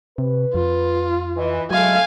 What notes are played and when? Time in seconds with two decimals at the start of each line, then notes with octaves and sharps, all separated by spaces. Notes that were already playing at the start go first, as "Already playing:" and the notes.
0.18 C3 B4
0.55 F2 F4
1.37 E3 D#5
1.71 F#3 G#3 A3 F5 G#5